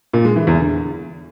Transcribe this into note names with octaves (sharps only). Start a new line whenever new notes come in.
A#2
G#3
E3
E2
D3